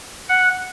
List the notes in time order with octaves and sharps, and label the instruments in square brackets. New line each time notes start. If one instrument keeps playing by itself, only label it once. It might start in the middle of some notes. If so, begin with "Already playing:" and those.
[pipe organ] F#5